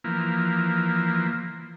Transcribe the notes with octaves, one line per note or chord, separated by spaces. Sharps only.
E3 F3 A#3